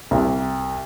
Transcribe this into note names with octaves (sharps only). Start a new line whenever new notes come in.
C2